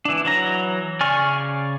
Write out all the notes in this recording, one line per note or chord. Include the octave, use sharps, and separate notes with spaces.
E3 D4
E3 F#3 A#5
C#3 D5 G#5 C#6 F6